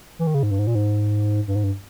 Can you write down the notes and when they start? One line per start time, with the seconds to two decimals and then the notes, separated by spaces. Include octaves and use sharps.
0.19 E3
0.27 D#3
0.34 C#3
0.43 G#2
0.51 G2
0.59 G#2
0.67 A#2
0.75 G#2
1.47 G2
1.55 G#2
1.64 G2